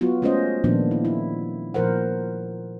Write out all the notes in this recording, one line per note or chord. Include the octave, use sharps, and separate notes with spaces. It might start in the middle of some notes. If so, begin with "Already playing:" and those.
F#3 B3 F4 F#4
G#3 A3 C#4 F4 C5 D#5
A#2 D#3 F3 A#3 B3 D4
E4
E4
A#2 F3 A#4 C5 F#5